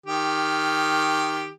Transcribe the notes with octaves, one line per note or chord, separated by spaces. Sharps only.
D#3 G4